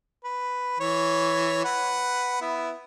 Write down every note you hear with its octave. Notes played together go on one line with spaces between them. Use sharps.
B4
E3 C#5
B4 F#5
B3 E4